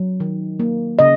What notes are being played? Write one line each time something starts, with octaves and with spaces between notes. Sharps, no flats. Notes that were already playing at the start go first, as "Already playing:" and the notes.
Already playing: F#3
D#3
A#3
C#3 D#5